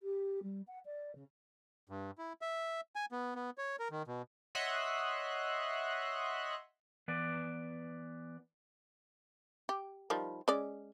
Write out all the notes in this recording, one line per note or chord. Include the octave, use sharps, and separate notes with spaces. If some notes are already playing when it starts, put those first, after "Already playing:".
G4
G3
F#5
D5
C#3
G2
E4
E5
G#5
B3
B3
C#5
A#4
D#3
B2
C#5 D#5 E5 F#5 C6 F#6
E3 B3 B4 D5
G4
D#3 F3 G3
G#3 C#4 D5